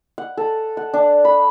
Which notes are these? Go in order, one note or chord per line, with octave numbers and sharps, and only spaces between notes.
F#5
A4
F#5
D4
B5